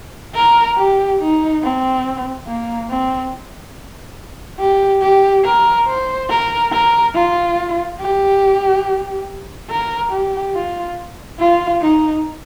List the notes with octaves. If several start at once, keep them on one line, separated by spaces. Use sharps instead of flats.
A#4
G4
D#4
C4
A#3
C4
G4
G4
A#4
C5
A#4
A#4
F4
G4
A#4
G4
F4
F4
D#4